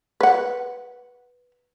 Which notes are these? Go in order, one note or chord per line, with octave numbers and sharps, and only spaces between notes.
B4 F#5